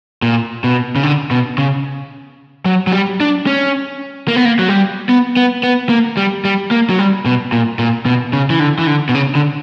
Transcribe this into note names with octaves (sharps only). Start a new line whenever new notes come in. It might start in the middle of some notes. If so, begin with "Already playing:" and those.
A#2
B2
C#3
D3
B2
C#3
F#3
F#3
G3
D4
C#4
A#3
B3
A#3
F#3
G3
B3
B3
B3
A#3
G3
G3
A#3
F#3
G3
B2
A#2
A#2
B2
C#3
E3
D3
E3
D3
B2
C#3
D3